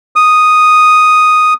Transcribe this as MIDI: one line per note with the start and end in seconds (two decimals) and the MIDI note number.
0.16 1.54 87